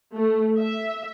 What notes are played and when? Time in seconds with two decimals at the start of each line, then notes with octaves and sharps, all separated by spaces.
0.14 A3
0.58 E5